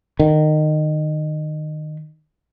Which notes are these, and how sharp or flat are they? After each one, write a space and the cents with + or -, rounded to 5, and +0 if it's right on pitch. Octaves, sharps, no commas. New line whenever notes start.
D#3 -20